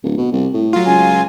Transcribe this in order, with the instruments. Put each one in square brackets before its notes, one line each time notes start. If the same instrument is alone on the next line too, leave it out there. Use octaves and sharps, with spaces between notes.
[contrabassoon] D1
B2
C2
A2
[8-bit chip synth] F#3 F4
[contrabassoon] C#2 [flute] G#5